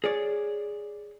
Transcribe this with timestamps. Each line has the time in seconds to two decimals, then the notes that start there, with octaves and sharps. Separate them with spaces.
0.04 G#4 C#5 D5